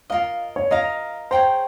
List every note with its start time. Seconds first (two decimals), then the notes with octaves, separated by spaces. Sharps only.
0.10 F4 A#4 D#5 F5
0.56 C#5
0.71 F4 A#4 D#5 F5 A#5
1.31 G#4 C5 C#5 G5 A#5